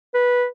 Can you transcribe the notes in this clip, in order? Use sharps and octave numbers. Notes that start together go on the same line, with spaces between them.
B4